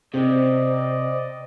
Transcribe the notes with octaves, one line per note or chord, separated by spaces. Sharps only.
C3 C4 C5 D5 D#5